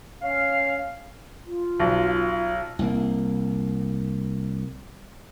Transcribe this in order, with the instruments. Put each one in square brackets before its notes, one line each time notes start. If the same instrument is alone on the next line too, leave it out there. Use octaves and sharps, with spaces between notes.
[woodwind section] C#4 F5
[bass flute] F4
[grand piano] B1
[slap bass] C2 A#3